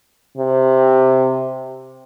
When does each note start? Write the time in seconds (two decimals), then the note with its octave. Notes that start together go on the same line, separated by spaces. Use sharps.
0.38 C3